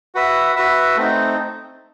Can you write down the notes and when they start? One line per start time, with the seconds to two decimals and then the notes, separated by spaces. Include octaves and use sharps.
0.15 F#4 B4 E5
0.56 F#4 B4 E5
0.96 A3 C4 D#4